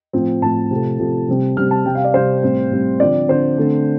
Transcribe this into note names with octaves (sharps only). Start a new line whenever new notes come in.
A2 F3 C4
A2 F3 C4 A5
C3 F3 A3
C3 F3 A3
C3 G3 C4
C3 G3 C4 F6
A5
C3 G3 C4 G5
F5
D5
C3 G3 C4 C5
A2 G3 C4
A2 G3 C4
D3 F3 C4 D5
D3 F3 C4 C5
D3 A3 C4